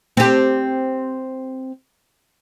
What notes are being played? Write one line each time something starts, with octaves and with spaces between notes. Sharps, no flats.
C4 G4